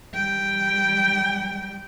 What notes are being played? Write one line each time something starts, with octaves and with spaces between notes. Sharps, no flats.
G3 G5